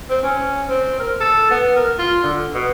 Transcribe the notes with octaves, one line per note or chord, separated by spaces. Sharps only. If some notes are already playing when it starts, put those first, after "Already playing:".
C4
C#4
C4
A#4
A4
B3
A#4
F4
D3
B2